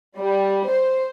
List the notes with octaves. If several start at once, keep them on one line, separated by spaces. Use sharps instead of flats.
G3
C5